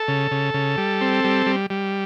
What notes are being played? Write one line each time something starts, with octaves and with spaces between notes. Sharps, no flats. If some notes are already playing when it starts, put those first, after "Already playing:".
Already playing: A4
C#3
C#3
C#3
G3
C4
G3
G3
G3